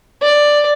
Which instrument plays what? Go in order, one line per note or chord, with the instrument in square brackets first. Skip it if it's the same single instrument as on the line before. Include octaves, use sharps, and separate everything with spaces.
[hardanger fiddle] D5